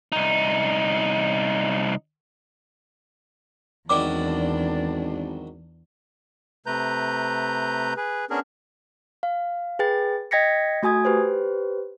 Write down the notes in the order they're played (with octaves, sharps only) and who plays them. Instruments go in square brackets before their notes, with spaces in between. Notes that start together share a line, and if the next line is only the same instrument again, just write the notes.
[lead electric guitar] C2 D#4
[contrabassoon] G#1 [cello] E2 D4 [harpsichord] D#3 F#3 E4 [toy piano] D5 D6
[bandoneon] C3 A3 B4 A#5 G6
G#4 B4
B3 C#4 D4 G#4 A#4
[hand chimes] F5
G#4 B4 G5 A6
D#5 G5 G#6 A#6 B6 C#7
A3 F#4 G#5 D#6 G#6
G4 B4 C5